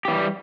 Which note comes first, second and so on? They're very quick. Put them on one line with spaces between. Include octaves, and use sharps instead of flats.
G4 E3 G3